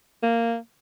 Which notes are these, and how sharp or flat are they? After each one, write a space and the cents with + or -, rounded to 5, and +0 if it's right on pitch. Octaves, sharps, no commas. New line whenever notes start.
A#3 -10